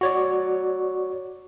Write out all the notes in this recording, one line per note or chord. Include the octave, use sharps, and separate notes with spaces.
F#4 C#5 D5